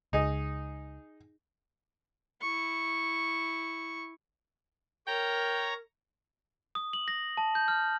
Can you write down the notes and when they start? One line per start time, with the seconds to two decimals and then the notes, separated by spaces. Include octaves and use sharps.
0.13 C#2 D#4 G#4 D#5
2.41 E4 C#6
5.07 A#4 C#5 G5 A#5
6.75 D#6
6.93 F#7
7.08 A#6
7.37 A5
7.55 G6
7.68 F6